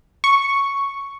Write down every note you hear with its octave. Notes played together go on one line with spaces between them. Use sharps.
C#6